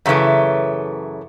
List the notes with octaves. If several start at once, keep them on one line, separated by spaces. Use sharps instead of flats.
F#2 C#3 E3 A3